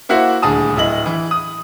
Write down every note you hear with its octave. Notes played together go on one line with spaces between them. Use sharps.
A#3 E4 F#4 C5 E5 F#5
D#1 D2 G#4 A5 D#6
D1 E4 D#5 F#7
E3
D#6